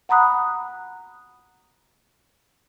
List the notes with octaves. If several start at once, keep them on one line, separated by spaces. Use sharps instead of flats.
F#5 A#5 B5 D#6 F#6